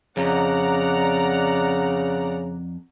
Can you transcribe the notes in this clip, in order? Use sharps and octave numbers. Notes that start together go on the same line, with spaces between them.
F2 C#3 D5 F#5 A#5